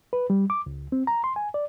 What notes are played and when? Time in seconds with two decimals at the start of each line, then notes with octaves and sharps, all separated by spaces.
0.13 B4
0.30 G3
0.50 D6
0.66 C#2
0.92 C4
1.07 A#5
1.24 C6
1.36 G#5
1.54 D5